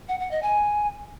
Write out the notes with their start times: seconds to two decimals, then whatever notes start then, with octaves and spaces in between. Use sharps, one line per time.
0.08 F#5
0.20 F#5
0.31 D#5
0.43 G#5